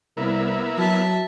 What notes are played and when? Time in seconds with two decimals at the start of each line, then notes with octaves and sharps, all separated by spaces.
0.17 C2 A#3 B3 E4
0.77 F#3 E5 A5